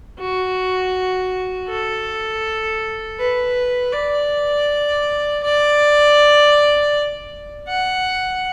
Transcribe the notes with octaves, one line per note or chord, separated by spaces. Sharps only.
F#4
A4
B4
D5
D5
F#5